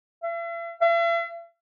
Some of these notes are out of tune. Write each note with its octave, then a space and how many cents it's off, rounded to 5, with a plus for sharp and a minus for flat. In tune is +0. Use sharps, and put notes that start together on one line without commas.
E5 +45
E5 +45